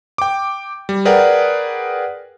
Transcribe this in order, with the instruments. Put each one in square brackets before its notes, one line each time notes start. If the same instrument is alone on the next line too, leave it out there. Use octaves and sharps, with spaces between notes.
[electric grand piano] G5 D6
G3
G#4 A#4 B4 D5 F#5 G5